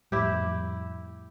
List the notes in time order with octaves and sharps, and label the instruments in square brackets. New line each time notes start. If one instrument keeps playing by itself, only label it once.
[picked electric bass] F2 A2 G3 [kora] E4 G4